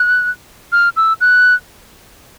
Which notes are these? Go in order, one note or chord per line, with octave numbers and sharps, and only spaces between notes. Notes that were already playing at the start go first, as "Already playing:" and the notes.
Already playing: F#6
F6
E6
F#6